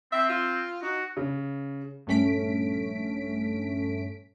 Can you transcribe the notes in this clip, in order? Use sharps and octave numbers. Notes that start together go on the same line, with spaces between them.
C4 E5
F4
D#4 F#4
C#3
A#1 G2 A3 C#4 B6 D7